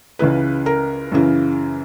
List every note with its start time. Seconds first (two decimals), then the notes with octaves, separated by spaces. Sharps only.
0.19 C#2 C#3 E3 B4
0.66 A#4
1.12 F#2 C#3 E3